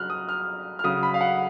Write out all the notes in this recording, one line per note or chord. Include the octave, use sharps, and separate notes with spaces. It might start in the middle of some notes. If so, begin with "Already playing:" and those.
Already playing: C#3 F#3 F6 F#6
D#6
F6
F6
C#3 F#3 D#6
B5
F5
F#5